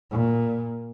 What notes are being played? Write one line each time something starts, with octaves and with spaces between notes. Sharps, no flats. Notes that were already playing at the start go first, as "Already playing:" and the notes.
A#2